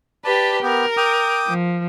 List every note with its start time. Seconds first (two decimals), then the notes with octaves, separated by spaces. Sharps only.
0.24 G4 B4 D5 A5
0.63 B3 G4 A#4
0.97 G5 D6 D#6
1.47 F3